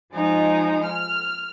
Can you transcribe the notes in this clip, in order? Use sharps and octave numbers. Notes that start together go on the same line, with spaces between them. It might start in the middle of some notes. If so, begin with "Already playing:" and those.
F3 G#3 D#4
F6